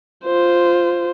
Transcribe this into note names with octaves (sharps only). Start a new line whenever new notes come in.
F4 C5